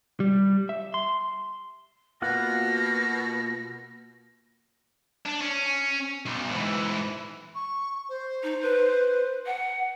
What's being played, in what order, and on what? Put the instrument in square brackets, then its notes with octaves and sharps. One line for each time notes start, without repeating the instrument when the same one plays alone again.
[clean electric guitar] G3
E5
C6
[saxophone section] B2 [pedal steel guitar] A#3 F4 F#5 [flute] A#6
[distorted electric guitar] D4
C#4
B1
G#2 E3
[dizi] C#6
C5
[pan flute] D#4
B4
F#5